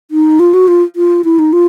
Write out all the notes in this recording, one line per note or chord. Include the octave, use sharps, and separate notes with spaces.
D#4
F4
F#4
F4
F4
E4
D#4
F4